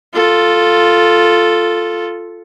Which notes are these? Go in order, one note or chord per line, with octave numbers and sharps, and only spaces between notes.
F4 A4